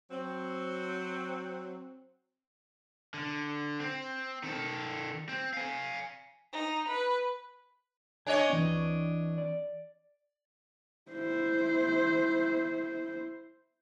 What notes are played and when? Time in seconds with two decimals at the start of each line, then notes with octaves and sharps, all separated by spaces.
0.10 F#3 C4
3.14 D3
3.80 C4
4.43 D#3 A4
5.29 C4
5.54 F5 G#5
6.53 D#4
6.88 B4
8.27 D4 C#5 D#5 G#5
8.50 E3 C4
9.38 D5
11.12 E4 C5